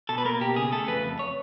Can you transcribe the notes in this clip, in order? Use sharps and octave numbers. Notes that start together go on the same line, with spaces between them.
B2 A4
B4
A#3 A#4
B2 G4
C#3 G#4
A3 A4
F2 B4
F2
C#5